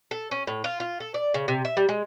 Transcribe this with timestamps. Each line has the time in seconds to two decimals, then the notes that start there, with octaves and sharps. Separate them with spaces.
0.11 A4
0.31 C#4
0.47 A2
0.64 F4
0.80 F4
1.00 A4
1.14 D5
1.34 C#3
1.48 C3
1.65 E5
1.77 G3
1.89 G#3